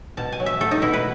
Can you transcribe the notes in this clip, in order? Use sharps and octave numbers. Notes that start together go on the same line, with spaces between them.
B2 A5
G#5
F#3
E5
A3 A4
D#4
B2 E4
B4